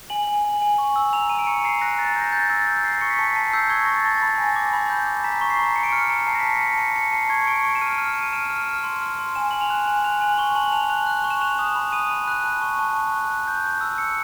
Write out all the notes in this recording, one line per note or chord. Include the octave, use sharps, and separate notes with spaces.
G#5 F#7
G#5
G#5
G#5
C#6
E6
A#5 F7
A#5 D#7
D7
C#6 C#7
A#5 C7
F#6 A#6
A#5 A6
G6
A#6
G6 A6
E6 A6
G6 A#6
G6 C7
C#6 C#7
B6
A5 C7
A5 C7
E6 G6
C#6 G#6
C#6 A#6
A6
A5
A6
B5 A#6
G#5
D6
B5
G6
D6
A#5 B6
C#6
C7
A#5
C#6 C#7
D7
F6 C#7
A#5
A5 C7
A#6
A5 B6
C#7
A5
A5 C#7
A5 C#7
A5 C7
C#6 G#6
C#7
C#6 D7
C#6 D7
E7
F6 D#7
F6
F6 D7
D#7
F6 E7
F6
F6
C6
F6
C6
G#5 E7
G#5 F#7
F7
F#6
G#5 F#7
F#6 F7
G#5 F#7
C#6 G7
A5 F#7
A5 F7
F#6 F7
F#6
C#6
E7
F#6 F7
D#6
B5
D#6 D#7
B5
F#6
A5
C#6
A5
C#6
F#6
F#6
G6
G6
E6
E6 C#7